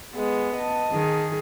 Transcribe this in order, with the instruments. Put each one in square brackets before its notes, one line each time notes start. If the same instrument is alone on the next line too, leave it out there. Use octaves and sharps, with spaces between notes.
[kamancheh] G#3 [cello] B3
[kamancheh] D#5 A5
[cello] D#3 G#4